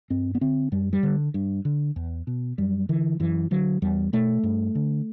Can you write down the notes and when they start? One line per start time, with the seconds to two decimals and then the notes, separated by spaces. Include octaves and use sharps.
0.10 G2 C4
0.35 B3
0.41 D3 C4
0.72 F#2 G3
0.93 G3
1.03 D3
1.34 G2
1.65 D3
1.96 E2
2.27 B2
2.58 F#2 G3
2.89 D3 E3
3.20 F#2 E3
3.51 D3 F#3
3.82 E2 G3
4.13 B2 A3
4.43 G2
4.75 D3